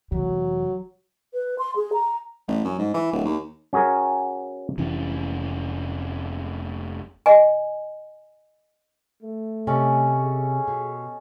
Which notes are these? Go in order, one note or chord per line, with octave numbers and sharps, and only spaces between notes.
F1 E3 F#3
B4
C6
G#4
A#5
A1
F#2
G#2
E3
D1
D#2
C#4 F#4 G#4 A#4
F1 E3 C#4
D#5 G#5
A3
C3 C#4 A4 D#5
G#4
B2